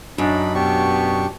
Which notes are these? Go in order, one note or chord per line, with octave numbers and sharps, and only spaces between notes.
F#2 D4 D#4 B5
B2 B3 D4 G4 C#6